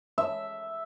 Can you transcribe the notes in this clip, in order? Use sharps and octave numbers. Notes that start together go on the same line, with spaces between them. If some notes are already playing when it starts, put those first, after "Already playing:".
E5